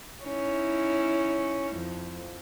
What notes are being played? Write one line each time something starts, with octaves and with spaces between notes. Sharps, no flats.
C#4 D#4 E4
F2